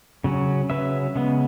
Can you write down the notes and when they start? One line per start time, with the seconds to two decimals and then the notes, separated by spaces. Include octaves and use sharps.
0.24 C#3 F#3 C#4
0.70 C#3 F#3 C#4 B4 E5
1.15 C#3 G#3 B3